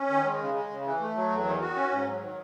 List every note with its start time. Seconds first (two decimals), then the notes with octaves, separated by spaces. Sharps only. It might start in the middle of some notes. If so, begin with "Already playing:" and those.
Already playing: C#4
0.09 D#3
0.25 G#3
0.39 C#3
0.54 G#3
0.70 C#3
0.85 E3
1.00 A3
1.16 F#3
1.30 E2
1.45 D#3
1.61 F#4
1.75 C#4
1.91 G#2
2.06 F#3
2.21 D#3